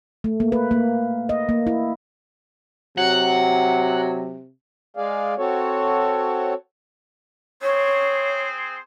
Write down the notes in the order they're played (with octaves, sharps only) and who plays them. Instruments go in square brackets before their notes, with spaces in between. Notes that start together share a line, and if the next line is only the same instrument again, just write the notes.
[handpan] A3
A#3
B4
A#3
D#5
A#3
E4
[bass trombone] C3 [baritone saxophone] F#3 [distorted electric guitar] F#5
[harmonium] G#3 G#4 D5 F5
C4 F#4 A4 C#5
[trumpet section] C4 G#4 C5 [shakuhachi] C#5